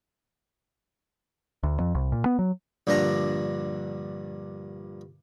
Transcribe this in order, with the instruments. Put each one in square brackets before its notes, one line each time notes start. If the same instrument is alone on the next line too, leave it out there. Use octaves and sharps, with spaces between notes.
[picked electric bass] D2
F2
C2
A#2
B3
F#3
[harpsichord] A#1 G2 D3 D4 A5 A#5